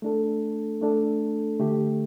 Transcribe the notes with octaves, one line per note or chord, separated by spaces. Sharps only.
A3 D4 A4
A3 D4 A4
D3 A3 G4